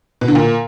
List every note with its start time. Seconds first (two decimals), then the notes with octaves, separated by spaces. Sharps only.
0.21 B2
0.28 D3
0.35 A#2